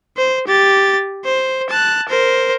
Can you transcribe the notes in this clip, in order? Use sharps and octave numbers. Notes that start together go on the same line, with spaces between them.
C5
G4 A6
C5
A5 F#6
A#4 C5